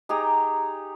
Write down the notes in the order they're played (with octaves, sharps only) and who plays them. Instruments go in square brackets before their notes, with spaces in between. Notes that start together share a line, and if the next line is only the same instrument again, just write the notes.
[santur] D#4 G4 G#4 A#5